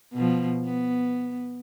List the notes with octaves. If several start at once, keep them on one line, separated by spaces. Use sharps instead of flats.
B2 F3
B3